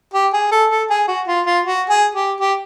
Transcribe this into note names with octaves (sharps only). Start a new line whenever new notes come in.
G4
G#4
A4
A4
G#4
F#4
F4
F4
F#4
G#4
G4
G4